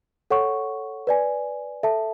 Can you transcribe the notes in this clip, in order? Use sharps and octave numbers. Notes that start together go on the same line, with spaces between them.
A4 C#5 F#5 C#6
B4 D5 G#5
A4 E5 A5